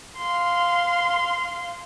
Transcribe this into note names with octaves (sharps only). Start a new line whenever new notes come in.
F5 C6